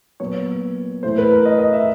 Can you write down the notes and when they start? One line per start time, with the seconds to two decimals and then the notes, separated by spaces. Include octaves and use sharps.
0.20 A#2 F#3 B3 C#5
1.03 A2 E3 A3 C5
1.18 B4
1.32 A#4
1.45 D#5
1.59 D#5
1.73 E5